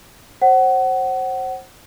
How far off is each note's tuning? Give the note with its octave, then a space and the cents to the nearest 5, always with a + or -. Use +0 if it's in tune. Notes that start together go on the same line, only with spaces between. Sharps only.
C5 +30 F#5 +25